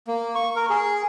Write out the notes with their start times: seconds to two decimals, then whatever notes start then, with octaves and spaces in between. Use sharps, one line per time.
0.07 A#3
0.35 C#6
0.56 A#4
0.70 G#4